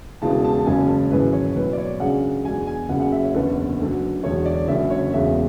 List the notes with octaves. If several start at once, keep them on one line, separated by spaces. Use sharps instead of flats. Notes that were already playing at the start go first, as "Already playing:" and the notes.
E1 E2 C#3 E3 A5
A5
A5
F#1 F#2 C#3 G#3 C#4 G#5
A5
G#1 F#2 E3 G#3 B4
C#5
B1 A2 F#3 B4
D5
C#5
F#2 C#3 G#3 D4 F#5
E2 B2 G#3 D4 G#5
G#5
F#1 F#2 C#3 F#3 F#5
F#5
E5
C#5
F#1 E2 D3 A3 B4
D2 D3 F#3
E1 D2 D3 C#5
D5
F#1 F#2 D3 E5
C#5
E1 E2 C#3 E5